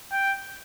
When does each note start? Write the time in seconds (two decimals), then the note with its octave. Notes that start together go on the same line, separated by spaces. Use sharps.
0.12 G5